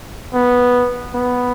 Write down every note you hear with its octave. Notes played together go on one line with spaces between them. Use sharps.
B3
B3